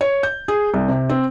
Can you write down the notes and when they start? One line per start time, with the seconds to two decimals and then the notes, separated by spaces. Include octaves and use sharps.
0.01 C#5
0.23 G6
0.48 G#4
0.74 C2
0.88 C3
1.10 C4